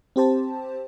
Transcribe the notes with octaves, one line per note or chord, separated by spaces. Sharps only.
C4 G4 C5 A5